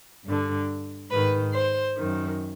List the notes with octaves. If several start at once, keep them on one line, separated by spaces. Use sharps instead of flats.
G2 D3
G#2 D#3 B4
C5
F#2 D#3